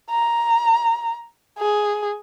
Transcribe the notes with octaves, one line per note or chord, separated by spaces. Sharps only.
A#5
G#4